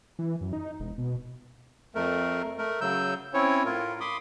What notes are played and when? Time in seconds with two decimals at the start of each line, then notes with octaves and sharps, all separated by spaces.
0.19 E3
0.41 F#2
0.53 D#4
0.80 E1
0.98 B2
1.95 F2 A3 A#4
2.58 A3 A#4
2.81 C#3 F#3 E6 G6
3.34 C4 C#4 E4 C#5
3.65 A2 F4 A#4
4.00 B5 C6 D6 D#6